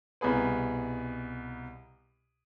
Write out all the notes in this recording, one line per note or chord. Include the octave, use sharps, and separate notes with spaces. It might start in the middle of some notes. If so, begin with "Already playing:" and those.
C2 B2 G#4 B4